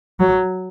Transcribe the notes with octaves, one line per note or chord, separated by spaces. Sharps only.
F#3